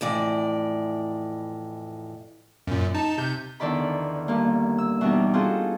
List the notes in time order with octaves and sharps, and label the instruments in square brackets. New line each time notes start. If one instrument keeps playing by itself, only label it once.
[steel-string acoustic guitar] F2 A2 E3 D5
[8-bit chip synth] F#2 A#2
D#4 A5
C3 G6
[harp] E2 D3 D#3 D5 B5
G2 A#3
E6
B2 E3 G3 D4 D#4
C4 F4 F#4 G#4 A4